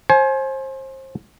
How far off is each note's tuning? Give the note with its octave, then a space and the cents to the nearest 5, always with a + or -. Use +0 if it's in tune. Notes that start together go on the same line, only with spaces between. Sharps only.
C5 +30 G#5 +30